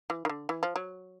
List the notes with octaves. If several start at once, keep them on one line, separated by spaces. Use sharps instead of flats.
E3
D#3
D3
E3
F3
F#3